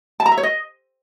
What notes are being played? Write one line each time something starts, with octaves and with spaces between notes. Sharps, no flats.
A5
A#5
E5
C#5
D#5